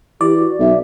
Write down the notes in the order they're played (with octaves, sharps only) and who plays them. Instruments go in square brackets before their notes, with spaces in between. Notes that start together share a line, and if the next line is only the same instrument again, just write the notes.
[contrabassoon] E3 [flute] G4 [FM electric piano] D5
[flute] F#4
[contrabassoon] B1 [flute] E5